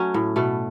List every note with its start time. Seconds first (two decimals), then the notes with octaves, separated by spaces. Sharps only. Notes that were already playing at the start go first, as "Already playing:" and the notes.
Already playing: F#3 A3 C#4 F#4
0.14 A2
0.36 B2 A3